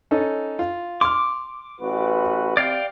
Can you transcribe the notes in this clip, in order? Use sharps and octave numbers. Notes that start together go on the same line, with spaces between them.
C#4 D#4 A4
F4
C6 D6 F6
A1 F#4 B4
C3 D5 F5 G5